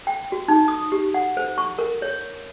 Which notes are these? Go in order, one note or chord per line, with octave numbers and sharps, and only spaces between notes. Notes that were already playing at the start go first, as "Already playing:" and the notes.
G5
F#4
D#4
D#6
G4
F#5
C5
C#6
A#4
C#5